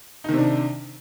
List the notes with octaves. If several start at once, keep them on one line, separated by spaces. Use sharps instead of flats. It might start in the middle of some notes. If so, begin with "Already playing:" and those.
C3 D#3 D4 D#4